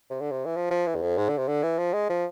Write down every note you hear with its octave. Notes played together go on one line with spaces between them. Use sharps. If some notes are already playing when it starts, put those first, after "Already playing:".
C3
D3
C3
E3
F3
F3
E3
E2
F2
G#2
D3
C3
D3
E3
F3
G#3
F3